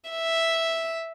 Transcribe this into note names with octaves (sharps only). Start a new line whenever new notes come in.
E5